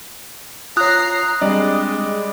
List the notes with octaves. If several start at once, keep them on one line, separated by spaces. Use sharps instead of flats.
F4 C#5 A#5 D#6 F#6 C7
G3 G#3 C4 D4 D5 D#5